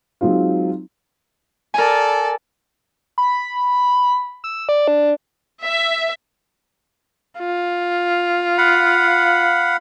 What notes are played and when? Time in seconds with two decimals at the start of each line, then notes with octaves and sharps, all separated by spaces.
0.21 F#3 G#3 C4 D#4 F4
1.74 A4 A#4 D5 G#5
3.18 B5
4.44 E6
4.69 D5
4.88 D4
5.62 E5
7.39 F4
8.58 F5 F#5 B5